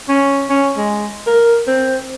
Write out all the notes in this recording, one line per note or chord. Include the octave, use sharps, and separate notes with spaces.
C#4
C#4
G#3
A#4
C4